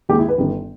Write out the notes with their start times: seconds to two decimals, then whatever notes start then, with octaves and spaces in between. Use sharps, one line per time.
0.09 D#2 D#3 G#3 G4
0.19 E4
0.29 B4
0.38 G1 G2 D#3